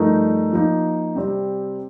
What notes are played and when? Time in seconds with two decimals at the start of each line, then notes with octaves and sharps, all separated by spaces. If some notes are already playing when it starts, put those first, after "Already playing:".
Already playing: G2 F3 A3 D#4 A#4
0.53 F3 A#3 D#4
1.15 C3 G3 C4